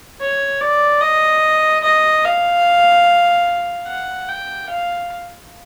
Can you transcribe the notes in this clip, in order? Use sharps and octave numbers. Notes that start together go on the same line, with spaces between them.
C#5
D5
D#5
D#5
F5
F#5
G5
F5